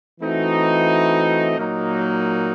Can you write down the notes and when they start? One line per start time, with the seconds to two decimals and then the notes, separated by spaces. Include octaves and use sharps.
0.20 E3 A3 C4 D#4 F#4
1.58 A#2 F#3 A#3 D#4